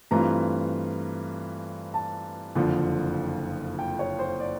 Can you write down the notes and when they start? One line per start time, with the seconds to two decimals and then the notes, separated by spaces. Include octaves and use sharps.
0.11 G2 E3 A3 C4 F4 A#5
1.94 A5
2.55 F#1 F2 D3 F3
3.79 G5
3.99 C#5
4.19 C5
4.40 D5